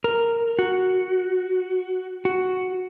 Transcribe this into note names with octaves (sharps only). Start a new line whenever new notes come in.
A#4
F#4
F#4